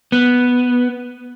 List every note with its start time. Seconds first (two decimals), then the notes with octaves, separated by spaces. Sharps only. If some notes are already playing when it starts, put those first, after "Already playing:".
0.12 B3